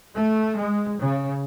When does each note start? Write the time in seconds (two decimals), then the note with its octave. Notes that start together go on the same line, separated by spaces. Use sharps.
0.16 A3
0.58 G#3
1.00 C#3